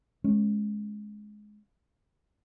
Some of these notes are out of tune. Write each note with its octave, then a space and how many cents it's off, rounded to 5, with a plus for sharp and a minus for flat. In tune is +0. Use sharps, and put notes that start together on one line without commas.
G#3 +15 C#4 -10